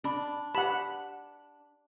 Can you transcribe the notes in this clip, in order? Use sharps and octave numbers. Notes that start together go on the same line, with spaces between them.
D4 D5 B5
G4 F#5 A5 B5 E7